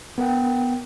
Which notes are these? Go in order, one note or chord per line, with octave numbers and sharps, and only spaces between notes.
B3 A#4 F#5 G5